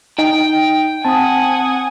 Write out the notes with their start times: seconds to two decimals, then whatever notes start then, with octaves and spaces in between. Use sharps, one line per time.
0.19 D#4 G5
1.05 C4 F#5 G#5 A5 D#6